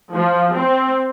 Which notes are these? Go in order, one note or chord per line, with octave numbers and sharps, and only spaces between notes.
F3
C4